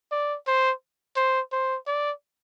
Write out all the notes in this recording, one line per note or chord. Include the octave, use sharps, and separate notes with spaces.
D5
C5
C5
C5
D5